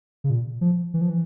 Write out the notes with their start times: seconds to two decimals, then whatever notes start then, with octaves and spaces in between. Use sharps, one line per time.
0.24 C#3
0.30 A#2
0.61 F3
0.94 E3
1.01 F3
1.10 E3